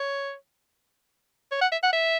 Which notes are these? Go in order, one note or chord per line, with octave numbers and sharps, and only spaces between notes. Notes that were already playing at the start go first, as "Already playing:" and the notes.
Already playing: C#5
C#5
F#5
E5
F#5
E5